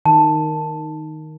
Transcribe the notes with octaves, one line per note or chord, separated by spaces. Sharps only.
D#3 A5